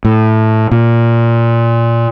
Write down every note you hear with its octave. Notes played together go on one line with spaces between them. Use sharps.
A2
A#2